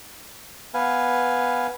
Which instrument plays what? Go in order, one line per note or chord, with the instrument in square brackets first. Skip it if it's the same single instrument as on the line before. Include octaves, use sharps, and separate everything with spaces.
[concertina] B3 B4 F5 G#5